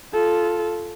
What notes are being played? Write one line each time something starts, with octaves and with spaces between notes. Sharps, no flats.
F4 A4